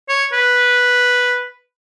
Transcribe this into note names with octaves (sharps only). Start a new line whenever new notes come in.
C#5
B4